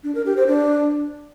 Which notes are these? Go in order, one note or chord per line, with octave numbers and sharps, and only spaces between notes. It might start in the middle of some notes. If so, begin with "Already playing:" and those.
D4
A#4
G4
C5
D4